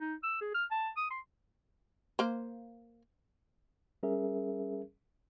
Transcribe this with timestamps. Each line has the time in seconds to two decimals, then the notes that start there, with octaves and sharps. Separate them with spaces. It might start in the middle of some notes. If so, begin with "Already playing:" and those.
0.01 D#4
0.23 E6
0.41 G#4
0.54 F6
0.71 A5
0.97 D#6
1.10 C6
2.19 A#3 C5
4.03 G3 C#4 G#4 A#4 E5